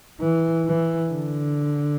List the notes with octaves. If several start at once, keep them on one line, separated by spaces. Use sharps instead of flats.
E3
E3
D3